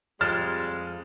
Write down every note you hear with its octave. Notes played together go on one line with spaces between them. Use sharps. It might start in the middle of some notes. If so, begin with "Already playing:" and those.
F2 G3 G#3 F6 A6 E7